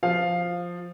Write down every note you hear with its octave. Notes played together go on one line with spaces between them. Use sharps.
F3 F5